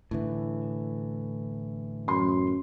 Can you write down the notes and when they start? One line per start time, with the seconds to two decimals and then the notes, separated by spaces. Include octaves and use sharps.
0.11 A2 D3 E3
2.08 F#2 C6